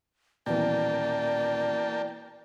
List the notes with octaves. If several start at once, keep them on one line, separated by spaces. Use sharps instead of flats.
D#1 B2 E3 A#3 D5 G5 A5